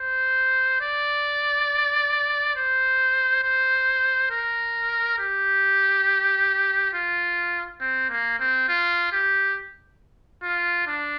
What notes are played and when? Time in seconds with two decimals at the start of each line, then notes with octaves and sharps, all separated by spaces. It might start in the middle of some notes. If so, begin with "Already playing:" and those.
Already playing: C5
0.81 D5
2.56 C5
3.44 C5
4.31 A#4
5.19 G4
6.94 F4
7.81 C4
8.10 A#3
8.40 C4
8.68 F4
9.12 G4
10.43 F4
10.87 D4